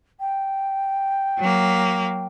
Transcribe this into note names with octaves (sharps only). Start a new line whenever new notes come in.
G5
F#3 A#3